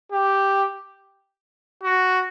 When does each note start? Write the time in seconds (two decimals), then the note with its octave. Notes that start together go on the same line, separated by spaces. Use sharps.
0.12 G4
1.84 F#4